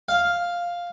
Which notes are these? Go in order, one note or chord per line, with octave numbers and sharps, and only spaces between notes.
F5